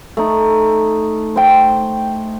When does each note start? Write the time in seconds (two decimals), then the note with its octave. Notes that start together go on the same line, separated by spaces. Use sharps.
0.17 A3 D#4
1.36 C5 G5